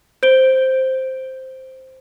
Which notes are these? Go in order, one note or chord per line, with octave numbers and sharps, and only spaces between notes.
C5 D7 G7